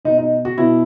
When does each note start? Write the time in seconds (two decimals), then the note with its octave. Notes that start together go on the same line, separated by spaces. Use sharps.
0.05 B2 D#4
0.18 D#4
0.45 F#4
0.58 B2 E4